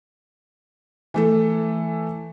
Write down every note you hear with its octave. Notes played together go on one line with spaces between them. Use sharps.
E3 A3 A4